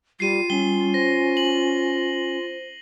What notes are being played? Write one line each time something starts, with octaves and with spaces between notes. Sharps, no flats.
G3 F4 C7 D#7
G3 C#4 G7
C5 A#6
F#7